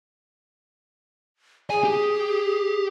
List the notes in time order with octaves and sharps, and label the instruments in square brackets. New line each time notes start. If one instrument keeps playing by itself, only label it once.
[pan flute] G#4 [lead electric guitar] G#5
[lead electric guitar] G4